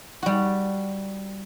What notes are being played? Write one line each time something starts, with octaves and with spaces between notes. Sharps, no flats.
G3 F#4